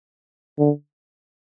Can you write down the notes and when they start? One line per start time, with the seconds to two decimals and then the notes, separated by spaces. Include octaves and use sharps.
0.59 D3